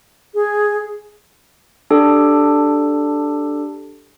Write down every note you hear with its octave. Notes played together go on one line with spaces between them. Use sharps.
G#4
D4 G4 A4